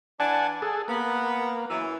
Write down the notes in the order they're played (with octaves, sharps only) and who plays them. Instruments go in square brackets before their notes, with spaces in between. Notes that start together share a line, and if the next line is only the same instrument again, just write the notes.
[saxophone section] E3 D4 [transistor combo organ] F#5 G#5 A5
[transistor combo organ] G#4 A4
[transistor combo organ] A#3 [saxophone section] B3
[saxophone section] F#2 E3